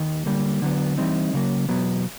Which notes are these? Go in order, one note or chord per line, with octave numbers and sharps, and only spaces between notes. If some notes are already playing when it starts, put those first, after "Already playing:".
Already playing: D#2 D#3
D3 G3 A#3
D3 F#3 B3
E3 G3 C4 D#4
C#3 F#3 A#3
E2 B2 F#3 B3